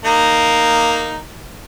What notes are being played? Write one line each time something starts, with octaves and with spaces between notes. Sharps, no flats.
A#3 D#4